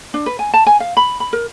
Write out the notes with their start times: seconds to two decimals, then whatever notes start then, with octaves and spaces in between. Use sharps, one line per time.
0.14 D4
0.26 B4
0.39 G#5
0.54 A5
0.66 G#5
0.80 F5
0.97 B5
1.20 B5
1.33 A#4